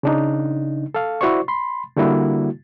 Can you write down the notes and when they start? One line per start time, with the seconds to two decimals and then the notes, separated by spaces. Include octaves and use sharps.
0.03 C#3 D4 D#4
0.94 A4 F5
1.21 E4 F#4 C5 D5 C#6
1.48 B5 C6
1.97 D3 G3 A#3 E4 F#4